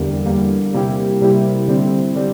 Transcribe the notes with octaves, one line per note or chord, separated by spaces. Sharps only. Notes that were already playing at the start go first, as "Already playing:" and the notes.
Already playing: E2 D3 G3 A#3
E2 D3 G3 A#3
C3 G3 A#3 E4 G4
C3 G3 A#3 E4 G4
D3 G3 C4 E4
D3 G3 C4